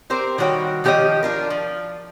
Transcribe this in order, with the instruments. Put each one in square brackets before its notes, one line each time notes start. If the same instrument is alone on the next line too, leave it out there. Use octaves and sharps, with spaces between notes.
[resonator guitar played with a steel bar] C4 G4 A#4 C5
D#3 G3 F#4 C#5 G5
D#3 F3 G4 A#4 C#5 D#5
D4 F4 A#4
F3